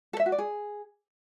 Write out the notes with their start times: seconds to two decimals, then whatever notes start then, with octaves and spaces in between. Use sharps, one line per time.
0.13 A4
0.20 E5
0.26 F#4
0.32 D5
0.38 G#4